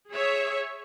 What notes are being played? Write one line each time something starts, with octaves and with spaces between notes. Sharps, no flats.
G#4 C#5 E5